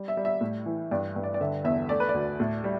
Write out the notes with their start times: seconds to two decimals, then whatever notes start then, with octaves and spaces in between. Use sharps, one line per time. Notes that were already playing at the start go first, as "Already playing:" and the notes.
Already playing: G3
0.08 E5
0.17 G3
0.25 E5
0.41 A2
0.66 E3
0.91 G2 D5
1.16 G2
1.24 D5
1.34 D5
1.41 D3 E5
1.64 E2 E5
1.89 A3 D5
2.00 B4
2.09 D5
2.14 D2
2.40 A2
2.64 G3